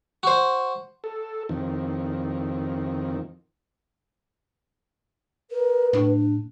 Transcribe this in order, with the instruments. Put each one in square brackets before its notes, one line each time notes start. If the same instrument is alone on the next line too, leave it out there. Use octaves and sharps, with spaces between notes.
[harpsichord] F#4 C5
[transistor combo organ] A4
F2 D#3
[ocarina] A#4 [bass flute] B4
[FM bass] A2 [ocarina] D4